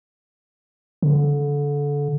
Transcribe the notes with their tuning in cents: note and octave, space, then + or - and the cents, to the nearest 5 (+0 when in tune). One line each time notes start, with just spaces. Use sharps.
D3 -25